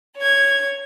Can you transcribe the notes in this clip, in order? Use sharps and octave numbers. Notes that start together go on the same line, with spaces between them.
C#5 G#6